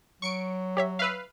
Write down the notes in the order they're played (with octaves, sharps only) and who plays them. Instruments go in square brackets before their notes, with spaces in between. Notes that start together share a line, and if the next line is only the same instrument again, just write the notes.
[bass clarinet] F#3 [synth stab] C#6 C#7 D7
[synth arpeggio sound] G4 C#5 E5
[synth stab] B4 F5 [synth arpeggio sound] E5 E6